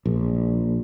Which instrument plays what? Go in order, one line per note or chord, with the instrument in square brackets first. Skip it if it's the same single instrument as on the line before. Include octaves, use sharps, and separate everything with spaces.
[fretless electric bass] A#1